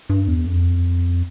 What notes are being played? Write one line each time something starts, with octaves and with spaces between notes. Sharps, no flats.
G2
E2
F2